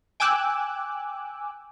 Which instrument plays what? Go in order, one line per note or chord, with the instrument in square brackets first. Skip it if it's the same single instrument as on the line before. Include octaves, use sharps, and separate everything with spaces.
[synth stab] G5 G#5 D6 E6 F#6